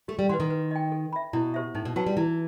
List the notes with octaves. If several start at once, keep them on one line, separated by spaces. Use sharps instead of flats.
A3 G4
G3
E3 B4 F#5 C6
D#3
B4
D#5 G5
A4
E5 B5
B2 E4
G4 C5 E5
A2 D#4
B2
F#3 F#4 B4 F#5 A5
G3
E3 E4